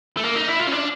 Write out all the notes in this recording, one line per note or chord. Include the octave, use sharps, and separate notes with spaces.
A3
A#3
D#4
E4
F4
C#4
D4